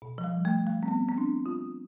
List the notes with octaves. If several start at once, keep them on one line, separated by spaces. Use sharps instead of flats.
B2
F3
G3
A3
G3
C4
B3
C4
D4
F4